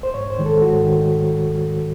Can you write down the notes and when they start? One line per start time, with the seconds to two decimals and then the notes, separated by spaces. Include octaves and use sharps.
0.03 C5
0.14 G#2 C#5
0.30 C5
0.39 D#3 G#3
0.46 A4
0.62 G#2 F#4
0.85 D#3